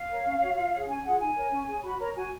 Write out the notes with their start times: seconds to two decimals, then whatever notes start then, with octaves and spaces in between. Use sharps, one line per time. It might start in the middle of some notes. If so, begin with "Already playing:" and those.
Already playing: F5
0.09 A#4 C#5
0.25 C#4
0.40 F#4 C#5
0.56 F4
0.72 G#4 C#5
0.88 C#4 G#5
1.04 F4 G#4 F#5
1.20 D#4 G#5
1.36 A#4 C#5
1.52 C#4
1.67 G#4 C#5
1.83 F#4 B5
2.00 A#4 C#5 A#5
2.16 F#4 G#5